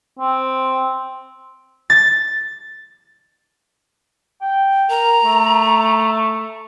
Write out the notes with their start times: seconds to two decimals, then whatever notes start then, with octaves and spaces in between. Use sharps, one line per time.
0.19 C4
1.90 A6
4.41 G5
4.90 A#4 A#5
5.24 A3